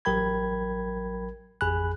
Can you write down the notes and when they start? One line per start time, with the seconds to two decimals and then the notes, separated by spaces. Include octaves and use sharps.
0.05 A1 F#3 A#4 G5 B5 G#6
1.61 A1 F2 G#4 G#5 B5 F#6